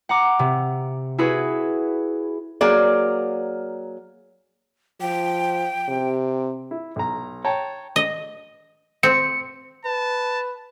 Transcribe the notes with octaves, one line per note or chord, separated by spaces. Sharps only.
F#5 A#5 D6
C3
E4 F#4 G#4 B4
F#3 A#3 G#4 D5
F3 G5
C3
E4
B1 A#5
C#5 G5 A5 A#5
D#5
C4 C#7
B4 A5